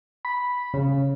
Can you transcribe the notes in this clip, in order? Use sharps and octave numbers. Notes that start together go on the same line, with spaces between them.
B5
C#3